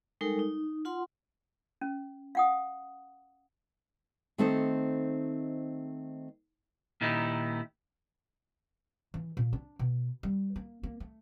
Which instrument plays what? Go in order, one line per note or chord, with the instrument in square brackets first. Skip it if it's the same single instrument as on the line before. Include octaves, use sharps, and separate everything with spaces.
[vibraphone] G3 G#3 D#4 A4 A#4
D#4
F4 F#5 C6
[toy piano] C#4
F5 F#5 D#6
[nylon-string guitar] D#3 A3 C4 D#4 A4 C5
[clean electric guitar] A#2 D#3 D#4 E4 G4
[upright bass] E3
A#2
D4
B2
G3
A#3
A#3
A3